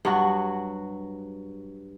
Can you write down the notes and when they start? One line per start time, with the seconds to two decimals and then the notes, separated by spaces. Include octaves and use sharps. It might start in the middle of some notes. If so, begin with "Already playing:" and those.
0.05 G2 F#3 F#4